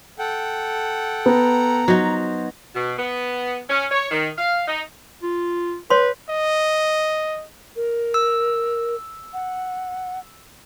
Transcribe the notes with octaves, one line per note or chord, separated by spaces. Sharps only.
A4 F#5 G5
B3 A#5
F#3 D#4 C5
B2
B3
C#4
C#5
D#3
F5
D#4
F4
B4 C#5 C6
D#5
A#4
E6
F#5